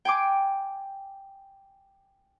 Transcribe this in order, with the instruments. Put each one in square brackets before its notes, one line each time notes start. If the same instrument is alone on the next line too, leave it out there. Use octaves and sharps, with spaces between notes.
[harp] G5 G#5 C6 D6